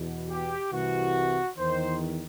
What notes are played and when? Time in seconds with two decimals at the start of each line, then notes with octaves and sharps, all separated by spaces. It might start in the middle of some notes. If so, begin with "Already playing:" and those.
Already playing: E2 B2
0.30 G4
0.72 C2 C3 E3 F#4
1.58 E2 D#3 C5